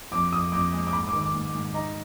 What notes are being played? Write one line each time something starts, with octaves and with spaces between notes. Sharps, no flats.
F2 D6
F2 D#6
F2 D6
G#3
D6
G#2 B5
D6
D#3
D6
G#2
G#2
D#4 A#5